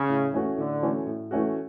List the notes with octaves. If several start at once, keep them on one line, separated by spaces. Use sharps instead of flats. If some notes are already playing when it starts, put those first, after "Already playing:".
Already playing: C#3
A2
E3 A3 C#4 F#4
A2 D3
E3 A3 C#4 F#4
A2
E3 A3 C#4 F#4